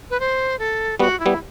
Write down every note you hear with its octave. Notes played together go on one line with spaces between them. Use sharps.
B4
C5
A4
G3 B3 F#4
E4
G3 B3